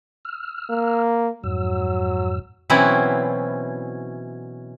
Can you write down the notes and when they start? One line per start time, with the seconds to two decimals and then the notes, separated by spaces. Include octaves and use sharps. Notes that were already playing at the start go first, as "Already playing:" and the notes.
0.25 E6 F6
0.70 A#3
1.44 F2 G#2 F#3 E6
2.70 B2 E3 F#3 C4 C#4 E4